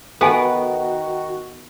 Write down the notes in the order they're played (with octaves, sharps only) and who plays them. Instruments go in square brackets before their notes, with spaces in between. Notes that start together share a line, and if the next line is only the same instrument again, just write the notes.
[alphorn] D#3 [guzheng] B3 [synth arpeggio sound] F#4 [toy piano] A4 G#5